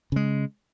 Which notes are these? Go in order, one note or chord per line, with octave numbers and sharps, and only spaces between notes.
C#3 G#3